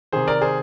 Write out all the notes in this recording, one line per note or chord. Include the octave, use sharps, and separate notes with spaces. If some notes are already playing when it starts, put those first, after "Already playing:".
C3 D#3 G#4 C5
A#4 D5
G#4 C5